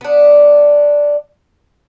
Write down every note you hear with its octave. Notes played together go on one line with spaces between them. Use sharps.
B3 D4